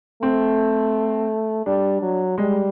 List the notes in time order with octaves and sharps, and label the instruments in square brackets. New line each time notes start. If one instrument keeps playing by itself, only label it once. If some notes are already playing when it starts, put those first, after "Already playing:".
[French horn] A3 [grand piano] C4
[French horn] G3 [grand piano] D4
[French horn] F#3
[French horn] G3 [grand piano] G#3